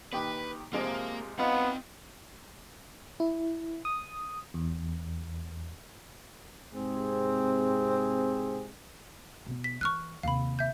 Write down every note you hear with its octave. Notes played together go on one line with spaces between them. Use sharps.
A#2 D#3 G4 B4
C3 F3 G#3 A#3
B3 C4 D#4 F4 F5 B5
E4
D#6
E2
G#2 C3 C4 G#4
B2 B3
B6
E3 E4 C#6 F6 F#6
D#2 C3 F5 B5
E5 G6